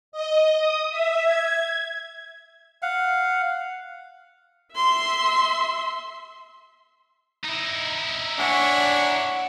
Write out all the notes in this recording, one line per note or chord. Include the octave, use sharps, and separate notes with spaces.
D#5
D#6
E5
G#6
F5 F#5
E5 C6
D#4 E4
D4 C#5 E5 F#5 G#5